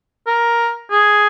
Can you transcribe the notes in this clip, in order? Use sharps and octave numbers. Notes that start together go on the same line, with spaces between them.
A#4
G#4